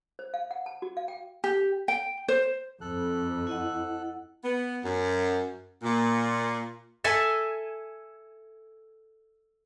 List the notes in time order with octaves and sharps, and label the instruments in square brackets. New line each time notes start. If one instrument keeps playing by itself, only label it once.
[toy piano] C5
F5
F#5
A5
F#4
F5
G5
[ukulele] G4
G5
C5
[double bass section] F2 [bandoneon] A4 F#6
[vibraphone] E4 D#5 F#5
[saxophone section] B3
F#2
A#2
[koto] A4 E5 G#5